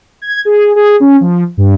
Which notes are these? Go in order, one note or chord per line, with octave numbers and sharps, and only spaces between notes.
G#6
G#4
G#4
C#4
F3
G2